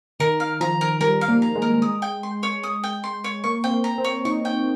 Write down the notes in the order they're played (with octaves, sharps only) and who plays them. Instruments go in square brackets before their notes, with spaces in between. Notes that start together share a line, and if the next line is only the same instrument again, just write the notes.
[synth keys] D#3 [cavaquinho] A#4
[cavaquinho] F5
[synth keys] F3 [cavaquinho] A#5
[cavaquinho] A#4
[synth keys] G3 [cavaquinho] A#4
[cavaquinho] F5
[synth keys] A#3
[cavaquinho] A#5
[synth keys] G#3
[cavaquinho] A#4
D#6
G5
C6
C#5
D#6
G5
C6
C#5
[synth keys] A#3 [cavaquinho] C#6
[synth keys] C4 [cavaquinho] G5
[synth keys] A#3
[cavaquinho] A#5
[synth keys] C4
[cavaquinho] C#5
[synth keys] D#4 [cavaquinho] C#6
[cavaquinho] G5